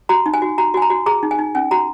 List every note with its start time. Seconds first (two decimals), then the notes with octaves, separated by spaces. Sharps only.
0.09 F#4 A#5
0.26 D#4
0.34 G#5
0.42 F#4
0.58 F#4 A#5
0.74 F#4 G#5
0.82 A#5
0.90 F#4
1.06 G#4 A#5
1.23 D#4
1.31 G#5
1.39 D#4
1.55 C#4 G#5
1.71 F#4 A#5